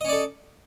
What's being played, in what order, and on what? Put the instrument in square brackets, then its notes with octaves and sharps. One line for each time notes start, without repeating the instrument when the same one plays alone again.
[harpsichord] D#5
C#4
D5
A4